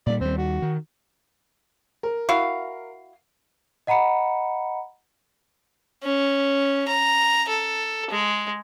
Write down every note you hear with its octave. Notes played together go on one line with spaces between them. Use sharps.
A#2 G3 D5
D#2 G3 C4
F#4
D#3
A#4
E4 F#4 F5
D#5 F#5 A#5 B5 C#7
C#4
A#5
A4
G#3